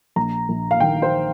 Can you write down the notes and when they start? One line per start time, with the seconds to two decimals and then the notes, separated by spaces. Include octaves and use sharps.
0.16 A#1 A#5
0.49 A#1
0.71 F5
0.80 D#3 G5
1.02 C5